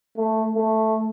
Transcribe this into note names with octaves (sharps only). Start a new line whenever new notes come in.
A3
A3